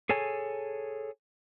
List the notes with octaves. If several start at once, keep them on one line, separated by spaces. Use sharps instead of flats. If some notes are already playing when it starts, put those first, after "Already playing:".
G#4 A4 C#5 G#5